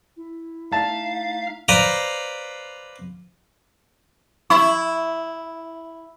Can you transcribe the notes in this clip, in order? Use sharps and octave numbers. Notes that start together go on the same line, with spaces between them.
E4
A3 D#4 E5 F5 A5
B4 C5 D5 F5 A#5
E4 C#6